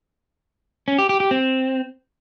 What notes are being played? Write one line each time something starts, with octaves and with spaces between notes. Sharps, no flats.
C#4
G4
G4
G4
C4